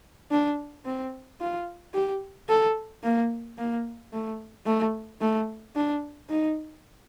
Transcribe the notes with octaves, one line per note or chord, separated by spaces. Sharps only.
D4
C4
F4
G4
A4
A#3
A#3
A3
A3
A3
D4
D#4